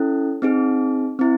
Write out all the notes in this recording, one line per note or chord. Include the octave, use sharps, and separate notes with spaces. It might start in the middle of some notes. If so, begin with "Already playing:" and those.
Already playing: C#4 E4 A4
C4 D#4 G#4
C4 E4